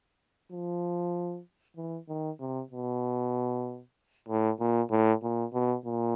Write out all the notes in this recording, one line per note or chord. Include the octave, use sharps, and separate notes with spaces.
F3
E3
D#3
C3
B2
A2
A#2
A2
A#2
B2
A#2